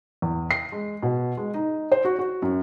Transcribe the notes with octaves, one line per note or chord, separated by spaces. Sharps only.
E2
C7
G#3
B2
G#3
D#4
C5
F#4
F#4
F#2